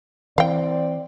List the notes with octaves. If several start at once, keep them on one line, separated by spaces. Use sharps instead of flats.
E3 C4 D5 F5 G5